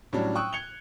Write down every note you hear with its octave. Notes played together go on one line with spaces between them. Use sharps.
A2 F#3 G3 C#4 D4
G5 C#6 D#6 E6 F#6
G#6 C#7 F7 G7